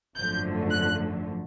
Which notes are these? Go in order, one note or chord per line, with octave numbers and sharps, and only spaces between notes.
G#1 F#2 D3 F3 A3 G6
F#6